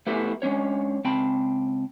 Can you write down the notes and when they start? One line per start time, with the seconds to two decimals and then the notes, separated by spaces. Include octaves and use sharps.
0.07 A3 B3 E4 G4 A4 B4
0.42 G#3 C#4 D4 C#5
1.05 C#2 C4 G5 A5 B5